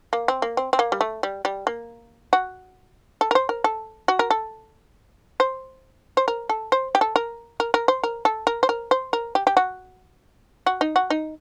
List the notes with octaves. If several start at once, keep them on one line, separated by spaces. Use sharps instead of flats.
A#3
C4
A#3
C4
C4
A#3
G3
A3
G3
G3
A#3
F#4
A4
A#4
C5
A#4
A4
F#4
A#4
A4
C5
C5
A#4
A4
C5
G4
A4
A#4
A#4
A#4
C5
A#4
A4
A#4
C5
A#4
C5
A#4
G4
G4
F#4
F#4
D#4
F#4
D#4